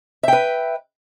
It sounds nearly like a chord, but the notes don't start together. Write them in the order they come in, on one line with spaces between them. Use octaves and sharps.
E5 G5 B4